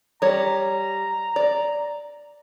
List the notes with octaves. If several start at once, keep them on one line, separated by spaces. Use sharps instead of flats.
G3 C#5 A#5
D5